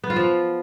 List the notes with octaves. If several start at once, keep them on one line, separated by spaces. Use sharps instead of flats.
B3
F4
F3